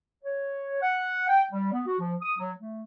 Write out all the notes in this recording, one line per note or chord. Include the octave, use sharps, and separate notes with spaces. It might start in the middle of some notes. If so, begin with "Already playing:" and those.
C#5
F#5
G5
G3
B3
F#4
F3
D#6
F#3
A3